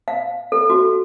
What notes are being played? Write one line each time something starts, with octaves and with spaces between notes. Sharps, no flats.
F5
A4
F#4